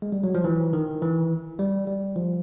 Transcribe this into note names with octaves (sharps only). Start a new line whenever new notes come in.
G#3
G3
F#3
F3
E3
D#3
E3
G3
G3
F3